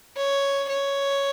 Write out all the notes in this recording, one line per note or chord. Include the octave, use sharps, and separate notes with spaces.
C#5
C#5